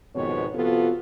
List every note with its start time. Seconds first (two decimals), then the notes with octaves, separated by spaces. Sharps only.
0.15 F2 G#2 B2 D#3 B3 C#5
0.55 C3 F3 B3 F4 F#4 A4